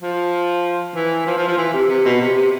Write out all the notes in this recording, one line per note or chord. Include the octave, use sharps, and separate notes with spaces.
F3
E3
F3
F3
F3
E3
C3
C3
B2
C3
C3